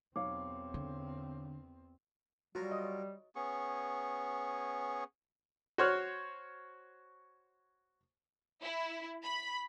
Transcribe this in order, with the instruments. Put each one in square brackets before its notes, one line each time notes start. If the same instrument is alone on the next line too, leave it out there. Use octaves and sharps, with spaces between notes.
[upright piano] B1 C#5 F5 [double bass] E2 C4 [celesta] D6
[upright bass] D3
[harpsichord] F#3 F4 A#4 [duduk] G3 [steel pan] F#4
[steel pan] D#5
C#5
[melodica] B3 C#4 G#4 C#6
[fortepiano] F#4 C5 C#5 C#6 F6 F#6
[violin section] E4
B5